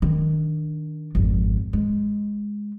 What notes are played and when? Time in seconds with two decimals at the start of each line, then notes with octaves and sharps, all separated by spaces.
0.02 D#3 D4
1.15 G#1 F2
1.73 G#3